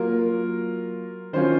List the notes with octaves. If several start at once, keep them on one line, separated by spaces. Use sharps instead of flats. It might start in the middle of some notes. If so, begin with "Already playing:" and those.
Already playing: F#3 A#3 F4 A#4
D#3 F#3 C#4 F4 C5